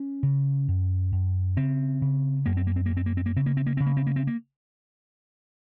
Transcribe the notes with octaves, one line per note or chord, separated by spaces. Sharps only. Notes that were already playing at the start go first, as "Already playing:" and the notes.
Already playing: C#4
C#3
F#2
F#2
C#3 C4
C#3
F#2 A#3
C4
A#3
C4
A#3
F#2
C4
A#3
C4
A#3
C#3 C4
A#3
C4
A#3
C#3 C4
A#3
C4
A#3
C4
A#3